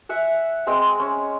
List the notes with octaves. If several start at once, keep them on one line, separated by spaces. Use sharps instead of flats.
E5 F#5 G#5
G#3 C4 C5 G5
C#4